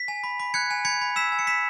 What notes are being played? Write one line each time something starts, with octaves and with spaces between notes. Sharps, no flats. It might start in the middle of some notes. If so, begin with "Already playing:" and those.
Already playing: B6
G#5
B5
B5
F#6 G#6 C#7
G#5
B5 G#6 C#7
B5
E6 B6 E7
G#5
C#7
B5 B6 E7